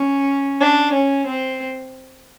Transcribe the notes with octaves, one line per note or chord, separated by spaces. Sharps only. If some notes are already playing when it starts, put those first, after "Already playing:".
Already playing: C#4
D4
C#4
C4